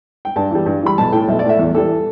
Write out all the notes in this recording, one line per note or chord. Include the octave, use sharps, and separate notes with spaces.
G5
G2 A5
E3 G3
G2
E3 G3 B5
B1 A5
A2 A3 G5
B1 E5
D5
A2 A3 E5
E2
E3 G3 A4